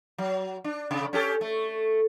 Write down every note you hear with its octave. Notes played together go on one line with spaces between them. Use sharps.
F#3
D4
C3
C#4 G4 A4
A3